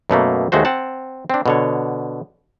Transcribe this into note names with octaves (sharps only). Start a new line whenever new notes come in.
F#2 B2 A3 A#3
D#2 G#3 A3 F#4 C5
C4 F#5 A5
C4 D4
B2 D3 C#5